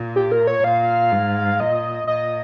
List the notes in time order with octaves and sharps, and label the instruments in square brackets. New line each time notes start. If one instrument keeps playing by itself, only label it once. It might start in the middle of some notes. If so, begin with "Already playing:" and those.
Already playing: [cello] A#2
[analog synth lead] G4
A#4
C#5
[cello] A#2 [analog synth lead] F5
[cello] G#2
[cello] A#2 [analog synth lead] D#5
[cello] A#2 [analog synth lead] D#5